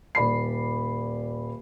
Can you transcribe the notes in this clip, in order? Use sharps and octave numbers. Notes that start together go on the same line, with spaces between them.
D#1 D5 B5 C7